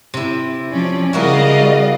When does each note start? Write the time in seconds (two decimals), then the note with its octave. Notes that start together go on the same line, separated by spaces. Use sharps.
0.14 C3 E4
0.72 F3 C#4 D5
1.13 C#3 G3 E4 F#4 A#4 D5 D#5 F5